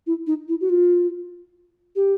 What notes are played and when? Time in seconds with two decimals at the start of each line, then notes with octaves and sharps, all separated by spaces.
0.07 E4
0.27 D#4
0.48 E4
0.61 F#4
0.69 F4
1.96 G4